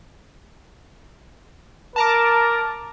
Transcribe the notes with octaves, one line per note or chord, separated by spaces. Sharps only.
A#4 A5 A#5 D6